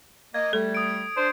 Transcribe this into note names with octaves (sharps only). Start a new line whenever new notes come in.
A#3 D#5 G#6
G3 A3 A4
D#6 D7
D4 C5